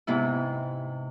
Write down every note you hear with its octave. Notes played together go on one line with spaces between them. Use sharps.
G#2 C3 B3 E4